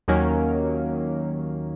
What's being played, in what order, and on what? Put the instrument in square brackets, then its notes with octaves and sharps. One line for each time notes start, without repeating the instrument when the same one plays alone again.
[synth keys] D#2 D#3 F#3 A#3 C#4